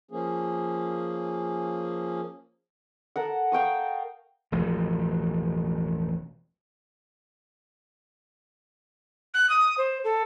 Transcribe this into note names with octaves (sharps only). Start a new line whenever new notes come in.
F3 A#3 C#4 G#4
A4 A#4 F#5
F5 G5 C#6 D#6
E1 A1 F3 G#3
F#6
D#6
C5
A4